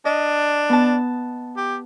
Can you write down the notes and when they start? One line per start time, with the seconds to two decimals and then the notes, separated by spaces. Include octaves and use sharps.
0.05 D4 D#5
0.69 B3 A5
1.57 G4